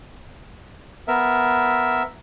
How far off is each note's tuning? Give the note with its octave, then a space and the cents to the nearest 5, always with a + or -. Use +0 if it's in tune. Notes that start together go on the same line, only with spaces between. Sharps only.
B3 +0 A#4 +0 E5 +0